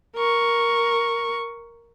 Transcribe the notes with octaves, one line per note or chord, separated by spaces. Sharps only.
A#4 C#6